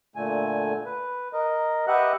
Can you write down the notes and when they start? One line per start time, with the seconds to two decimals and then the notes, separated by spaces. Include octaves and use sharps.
0.16 A#2 D3 A3 G#5
0.86 B4
1.33 A#4 D#5
1.88 G4 B4 D#5 E5 F#5 F#6